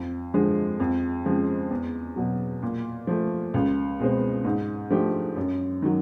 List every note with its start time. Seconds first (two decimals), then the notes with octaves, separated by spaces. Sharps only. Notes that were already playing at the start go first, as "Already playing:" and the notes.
Already playing: F2
0.34 D3 F3 G#3
0.80 F2
1.25 C#3 F3 G#3 C4
1.70 E2
2.16 B2 F#3
2.62 A#2
3.07 F3 A3
3.54 C#2
3.99 B2 G#3 C4
4.45 G#2
4.90 F3 A3 D4 G4
5.36 F#2
5.82 D#3 F#3